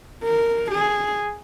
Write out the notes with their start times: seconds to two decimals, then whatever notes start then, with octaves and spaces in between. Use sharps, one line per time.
0.24 A#4
0.71 G#4